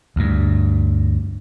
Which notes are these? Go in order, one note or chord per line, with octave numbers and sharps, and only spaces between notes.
D2 G2